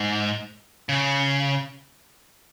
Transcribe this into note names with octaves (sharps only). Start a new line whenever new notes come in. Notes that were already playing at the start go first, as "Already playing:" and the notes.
Already playing: G#2
C#3